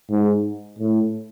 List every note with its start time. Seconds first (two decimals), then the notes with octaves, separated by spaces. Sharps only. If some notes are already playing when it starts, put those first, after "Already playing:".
0.10 G#2
0.79 A2